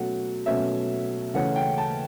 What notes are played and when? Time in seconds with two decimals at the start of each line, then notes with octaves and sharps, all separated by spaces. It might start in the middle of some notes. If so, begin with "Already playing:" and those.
Already playing: B2 F#3 A3 C#4 F#5
0.46 B2 F#3 A3 C#4 E5
1.34 C#3 E3 A3 C#4 F#5
1.56 G5
1.78 A5